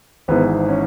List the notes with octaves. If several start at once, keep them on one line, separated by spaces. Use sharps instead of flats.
G#1 G#2 E3 B3
C#4